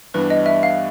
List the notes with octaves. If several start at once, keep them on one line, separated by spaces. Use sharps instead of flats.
G2 E3 G3 B3 D4 B4
D#5
E5
F5